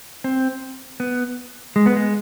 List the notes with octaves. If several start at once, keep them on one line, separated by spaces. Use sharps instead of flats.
C4
B3
G#3
B3
G#3